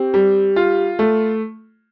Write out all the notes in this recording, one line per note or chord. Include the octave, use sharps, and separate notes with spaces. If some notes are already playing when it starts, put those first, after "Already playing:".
Already playing: C4 G4
G3
F4
A3